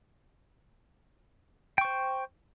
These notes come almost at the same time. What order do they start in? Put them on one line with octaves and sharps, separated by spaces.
G5 C#6 C5